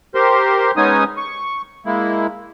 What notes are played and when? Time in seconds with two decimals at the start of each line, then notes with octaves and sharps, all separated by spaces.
0.15 G4 A#4 C5 C6
0.77 G#3 B3 C#4 D#4 G#5 D#6
1.17 C#6
1.86 G#3 A#3 E4